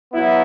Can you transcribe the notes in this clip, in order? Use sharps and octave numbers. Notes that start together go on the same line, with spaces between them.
F#3 B3 E4